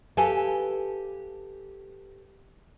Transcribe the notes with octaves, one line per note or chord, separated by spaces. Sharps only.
G4 A4 B4 F5 G#5 A5